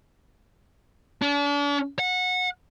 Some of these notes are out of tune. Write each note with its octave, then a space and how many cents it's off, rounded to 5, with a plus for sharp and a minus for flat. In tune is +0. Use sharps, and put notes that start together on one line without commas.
D4 -40
F#5 -20